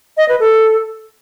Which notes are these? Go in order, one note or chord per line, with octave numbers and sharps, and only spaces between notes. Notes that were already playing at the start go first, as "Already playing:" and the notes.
D#5
B4
A4